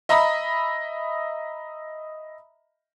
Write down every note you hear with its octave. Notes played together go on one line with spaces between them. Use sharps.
D#5 E5 A#5 B5 D#6